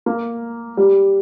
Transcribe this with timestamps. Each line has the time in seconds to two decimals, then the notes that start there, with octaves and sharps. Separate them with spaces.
0.06 A#3
0.77 G3